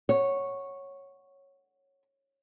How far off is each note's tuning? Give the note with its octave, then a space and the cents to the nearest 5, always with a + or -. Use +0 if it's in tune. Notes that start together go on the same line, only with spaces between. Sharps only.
C#5 -5 F#5 +0